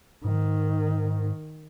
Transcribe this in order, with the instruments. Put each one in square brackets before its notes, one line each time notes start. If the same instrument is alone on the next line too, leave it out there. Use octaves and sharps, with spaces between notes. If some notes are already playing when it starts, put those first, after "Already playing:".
[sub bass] G#2 [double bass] D#3